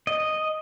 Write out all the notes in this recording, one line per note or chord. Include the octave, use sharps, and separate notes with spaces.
D#5